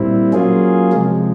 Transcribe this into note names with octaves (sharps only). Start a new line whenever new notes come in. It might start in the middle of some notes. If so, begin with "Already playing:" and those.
Already playing: A#2 G3 C4 E4
F#3 A#3 C#4 F4 G#4
C3 F3 G#3